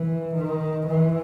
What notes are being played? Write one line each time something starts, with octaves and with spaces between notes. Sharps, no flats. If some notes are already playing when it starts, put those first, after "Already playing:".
Already playing: E3
D#3
E3